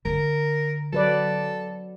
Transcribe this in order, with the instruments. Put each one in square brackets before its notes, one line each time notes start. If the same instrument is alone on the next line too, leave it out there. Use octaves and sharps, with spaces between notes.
[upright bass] D3 [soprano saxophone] A#4
[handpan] F#3 B4 D5 [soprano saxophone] A4